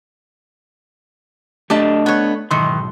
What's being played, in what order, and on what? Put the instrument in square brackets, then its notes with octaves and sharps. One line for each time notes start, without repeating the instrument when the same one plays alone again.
[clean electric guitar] A3 D4 D#5 [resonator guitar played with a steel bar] G4 A5
[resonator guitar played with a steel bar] B3 C#5
[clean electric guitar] B1 G#2 C6 [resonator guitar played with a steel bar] D#3 E3